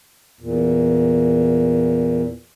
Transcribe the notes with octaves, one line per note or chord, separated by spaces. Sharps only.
E2 A#2